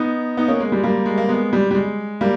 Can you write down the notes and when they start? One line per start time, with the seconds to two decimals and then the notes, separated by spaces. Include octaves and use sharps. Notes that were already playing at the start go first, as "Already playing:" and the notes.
Already playing: B3 D#4
0.37 B3 D#4
0.48 A#3 C#4
0.60 G#3
0.72 G3
0.77 G#3
0.83 G3 A#3
1.06 G#3
1.18 A#3
1.28 G#3 B3
1.53 G3
1.71 G3
1.75 G#3
2.21 G3 A#3